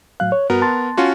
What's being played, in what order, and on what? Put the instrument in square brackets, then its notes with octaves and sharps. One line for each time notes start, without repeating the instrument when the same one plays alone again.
[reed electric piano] A2 F#3 F5 [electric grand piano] F#6
[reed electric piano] C#5
[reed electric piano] G2 F#4 [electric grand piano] B3 A#4
[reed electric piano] A5 C6 A6
[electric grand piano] C#4 F4 F#4